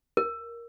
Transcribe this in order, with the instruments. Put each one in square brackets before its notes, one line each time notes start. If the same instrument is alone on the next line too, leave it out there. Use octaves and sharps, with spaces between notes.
[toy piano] A#4